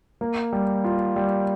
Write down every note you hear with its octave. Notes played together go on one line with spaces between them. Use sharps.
A#3
G3
F4
G3